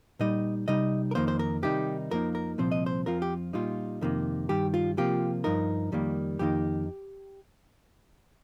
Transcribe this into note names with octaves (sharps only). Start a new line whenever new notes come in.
A#2 G3 D#4 D#5
C3 G3 D#4 D#5
A#4
F2 D#3 A#3 C5
C5
A#4
C3 D#3 G3 D#4 G4
F2 F3 A#3 D#4 A#4
A#4
C2 A#2 F3 C4 C5
D#5
C5
F2 F3 C4 F4 A#4
G4
A#2 G3 D#4 F4
F2 C3 D#3 A#3
G2 D#3 G3 G4
F4
C3 F3 A#3 F4 G4
G2 F3 D#4 A#4
F2 D#3 G3 A#3
F2 D#3 A#3 D#4 G4